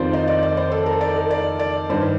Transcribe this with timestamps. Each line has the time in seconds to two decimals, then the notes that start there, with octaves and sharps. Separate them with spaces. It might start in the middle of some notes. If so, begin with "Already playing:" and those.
Already playing: F2 D#3 F4 C5 D5
0.13 D#4
0.27 D5
0.43 D5
0.57 C5
0.71 A4
0.86 A#4
1.01 D5
1.16 A#4
1.30 D5
1.59 D5
1.89 G2 D#3 C5